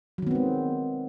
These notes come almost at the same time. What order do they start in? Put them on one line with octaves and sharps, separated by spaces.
F#3 D#3 B3 C4 G#3